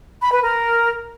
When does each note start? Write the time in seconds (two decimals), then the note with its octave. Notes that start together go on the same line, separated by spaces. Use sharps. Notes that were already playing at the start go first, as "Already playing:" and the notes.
0.21 B5
0.32 B4
0.44 A#4